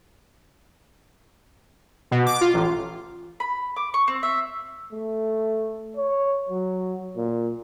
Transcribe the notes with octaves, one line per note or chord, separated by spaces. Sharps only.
B2
D6
F4
A1
B5
D6
C#6
C4
E5
A3
C#5
F#3
A#2